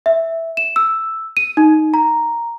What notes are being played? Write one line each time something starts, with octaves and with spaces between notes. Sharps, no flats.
E5
E7
E6
D#7
D#4
A#5